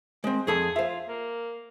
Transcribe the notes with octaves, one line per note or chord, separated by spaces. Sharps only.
G#3 C4
F2 G#4 A4 B5
F4 C5 E5
A#3